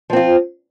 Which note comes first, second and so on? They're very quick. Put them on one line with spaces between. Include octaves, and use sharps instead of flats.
F3 C4 F4